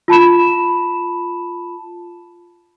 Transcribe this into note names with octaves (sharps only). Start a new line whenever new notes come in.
F4 A5 B5 E7